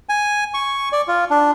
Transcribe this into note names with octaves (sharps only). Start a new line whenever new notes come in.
G#5
C#6
D5
F4
D4